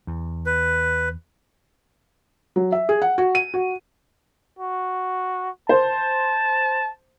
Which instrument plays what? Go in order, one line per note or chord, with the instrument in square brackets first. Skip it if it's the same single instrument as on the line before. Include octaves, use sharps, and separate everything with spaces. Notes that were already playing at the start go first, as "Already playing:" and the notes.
[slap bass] E2
[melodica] B4
[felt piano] F#3
E5
G#4
F#5
F#4
D#7
F#4
[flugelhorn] F#4
[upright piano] C5 [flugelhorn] A5